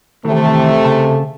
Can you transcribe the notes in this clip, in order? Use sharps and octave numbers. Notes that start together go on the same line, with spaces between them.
C3 D#3 E3 A3
C#3 A5